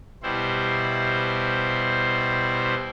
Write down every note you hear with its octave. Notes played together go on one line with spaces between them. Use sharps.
B2 G3 E4 C5